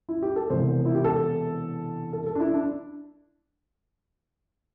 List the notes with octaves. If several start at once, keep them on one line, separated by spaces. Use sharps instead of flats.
E4
G4
A4
E1 E2 C3 C5
E4
G4
A4
A4
A4
D4
E4
D4